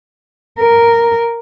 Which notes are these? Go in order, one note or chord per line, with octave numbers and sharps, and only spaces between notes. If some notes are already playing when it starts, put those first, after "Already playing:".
A#4